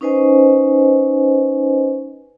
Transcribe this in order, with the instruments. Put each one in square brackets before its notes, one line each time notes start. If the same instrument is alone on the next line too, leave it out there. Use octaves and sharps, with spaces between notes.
[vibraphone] C#4 D#4 B4 C5 D#5 G#5